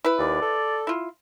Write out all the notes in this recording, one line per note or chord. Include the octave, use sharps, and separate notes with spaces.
E4 B4
D#2 D5
A4
E4 F4